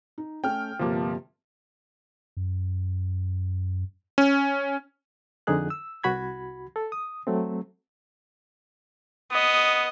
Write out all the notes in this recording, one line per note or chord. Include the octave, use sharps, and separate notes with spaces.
D#4
A3 C#4 G5 F6
G1 C3 F3 A#3 G4 A5
F#2
C#4
F2 D3 D#4 G#4 F#6
E6
C2 F#4 B5 G#6
A4
D#6
F#3 A3 C4
B3 D#5